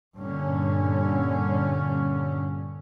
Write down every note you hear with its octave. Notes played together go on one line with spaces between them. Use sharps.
G2 A#2 D3 C#4